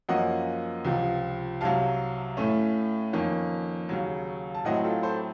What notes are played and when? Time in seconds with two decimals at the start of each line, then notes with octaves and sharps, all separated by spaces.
0.09 F#2 F3 A#3 C#4 D#5 F#5
0.85 C#2 C3 F3
1.61 C2 C3 F#3 F5 A5
2.37 A2 A3 C#4
3.13 F2 D#3 A#3 C#4
3.89 D#2 C#3 F#3
4.55 A5
4.65 A2 F#3 C4 D#5 F#5
4.84 F4 A4
5.03 A4 C5